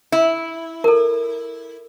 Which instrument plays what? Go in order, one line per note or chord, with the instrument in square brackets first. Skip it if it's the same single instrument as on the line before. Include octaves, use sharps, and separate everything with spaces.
[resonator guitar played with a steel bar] E4
[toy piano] A4 A#4